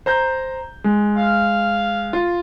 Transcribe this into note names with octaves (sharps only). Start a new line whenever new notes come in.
C5 A#5 G6
G#3
F5
F4